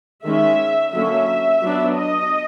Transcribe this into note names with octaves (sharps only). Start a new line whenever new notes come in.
D#3 G#3 C#4 E5
D3 F#3 A#3 C#4 E5
F#3 B3 D4
D#5